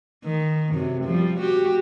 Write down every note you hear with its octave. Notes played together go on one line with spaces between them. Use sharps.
D#3
F#2 C3
F3 G3
F#4 G4